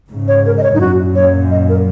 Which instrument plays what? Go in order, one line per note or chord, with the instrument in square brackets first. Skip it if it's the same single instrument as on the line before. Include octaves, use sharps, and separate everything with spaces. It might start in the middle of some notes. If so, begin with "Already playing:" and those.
[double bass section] G#2 C#3
[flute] C#5
A#4
D#5
C#5
D#4
[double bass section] F#2 A#2 [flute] F#4
[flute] C#5
D#5
A#4